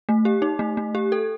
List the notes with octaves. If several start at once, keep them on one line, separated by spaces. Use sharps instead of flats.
A3
G4
D#4
A3
A3
G4
A4